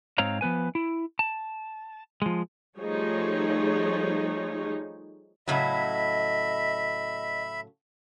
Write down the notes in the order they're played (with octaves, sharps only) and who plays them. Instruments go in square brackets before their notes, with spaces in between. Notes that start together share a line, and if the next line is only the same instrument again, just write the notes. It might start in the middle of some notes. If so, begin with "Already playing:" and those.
[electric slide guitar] G#2 C4 C#5 F5 A#5
F3 B3 B4 G#5
E4
A5
F3 G#3
[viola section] F3 G3 A3 D#4 G#4 C#5
[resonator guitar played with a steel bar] A2 C#3 F#3 [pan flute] D#5 [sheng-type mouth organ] E5 B5